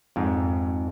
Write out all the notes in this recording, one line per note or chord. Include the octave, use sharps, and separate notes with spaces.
F2 G#2